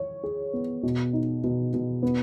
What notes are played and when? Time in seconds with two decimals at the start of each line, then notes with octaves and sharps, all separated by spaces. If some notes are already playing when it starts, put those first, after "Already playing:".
Already playing: C#5
0.24 G#4
0.53 B3
0.83 B2
1.13 D#4
1.44 B2
1.74 B2
2.03 B3